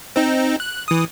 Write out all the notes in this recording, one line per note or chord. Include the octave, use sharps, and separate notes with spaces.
C4 D#4
F#6
E3 D#6